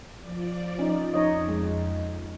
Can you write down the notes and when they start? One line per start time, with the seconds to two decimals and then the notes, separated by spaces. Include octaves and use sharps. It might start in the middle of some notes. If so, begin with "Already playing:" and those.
0.18 F3 D5
0.79 C#4 D#4
1.14 F2 D#4 C#5 D#5
1.48 G#3